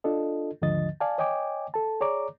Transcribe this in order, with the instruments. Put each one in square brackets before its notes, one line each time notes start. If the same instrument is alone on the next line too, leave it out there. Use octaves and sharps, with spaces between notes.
[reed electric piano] D4 F4 A4 D#5
D#2 G#2 D3 F3 D#5 A6
D5 F5 G#5 A5
C#5 D#5 G5 G#5 D6
A4 A5
G#4 C#5 D5 A#5 D6